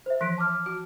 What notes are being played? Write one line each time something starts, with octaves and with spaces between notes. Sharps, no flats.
C5 E5
E3 F3 F#6 B6 D7
A5 D6 F6
F#4